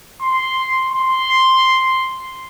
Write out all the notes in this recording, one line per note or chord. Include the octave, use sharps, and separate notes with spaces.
C6
C6